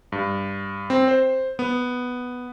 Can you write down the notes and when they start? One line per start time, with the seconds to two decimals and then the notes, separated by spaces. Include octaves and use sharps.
0.12 G2
0.90 C4
1.08 C5
1.59 B3